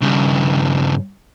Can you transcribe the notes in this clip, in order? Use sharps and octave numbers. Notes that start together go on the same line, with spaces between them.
G2 C#3